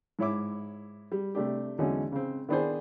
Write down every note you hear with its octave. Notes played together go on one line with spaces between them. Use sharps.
G#2 E4 C#5 E5 D6
G3
C3 A3 D4 G4
E2 D3 F#3 G#3 C#4 D#4
C#3 C4
D#3 B3 D4 E4 G#4 C5